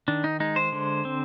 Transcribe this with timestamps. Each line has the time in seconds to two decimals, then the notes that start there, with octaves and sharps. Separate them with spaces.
0.08 D#3 D4
0.24 D#4
0.40 G#3 D#4
0.56 C5
0.72 D3
1.05 C4